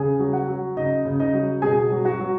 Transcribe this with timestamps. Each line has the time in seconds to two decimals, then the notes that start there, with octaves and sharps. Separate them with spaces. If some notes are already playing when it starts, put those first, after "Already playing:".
Already playing: C#3 G#4 G#5
0.20 F#3
0.33 F#4 F#5
0.48 F#3
0.77 C#3 D#4 D#5
1.05 C#3
1.20 D#4 D#5
1.34 F#3
1.62 B2 G#4 G#5
1.91 F#3
2.05 F#4 F#5
2.20 F#3